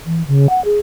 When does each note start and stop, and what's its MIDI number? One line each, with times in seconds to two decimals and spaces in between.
0.06 0.25 52
0.27 0.47 49
0.50 0.63 78
0.65 0.79 68